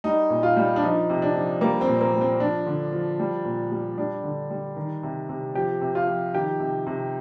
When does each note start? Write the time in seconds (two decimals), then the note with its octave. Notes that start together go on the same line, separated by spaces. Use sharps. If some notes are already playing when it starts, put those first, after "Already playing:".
0.04 G3 D#4
0.30 A#2
0.43 F4
0.57 G3
0.76 D4
0.83 F3 D#4
1.10 C3
1.22 D4
1.35 F3
1.61 G3 A#3
1.81 C4
1.88 A#2
2.01 A#3
2.14 G3
2.21 C4
2.40 F3 D4
2.66 D3
2.93 F3
3.20 G3
3.45 A#2
3.72 G3
3.97 G3 D4
4.24 D3
4.50 G3
4.76 D#3
5.03 C3
5.29 C3
5.55 F3 G4
5.81 C3
5.95 F4
6.08 F3
6.34 D#3 G4
6.60 C3
6.86 C3